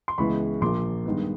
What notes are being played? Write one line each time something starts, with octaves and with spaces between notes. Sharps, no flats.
C6
C#2 C#3 E3 G#3 B3 B5 C#6
A#1 A#2 F3 A#3 C6 D6
G2 D#3 G#3 B3